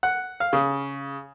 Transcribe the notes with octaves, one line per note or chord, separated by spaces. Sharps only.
F#5
F5
C#3